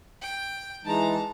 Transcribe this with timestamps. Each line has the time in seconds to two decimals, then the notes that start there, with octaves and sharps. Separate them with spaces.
0.22 G5
0.85 E3 G#3 D#4 A5 A#5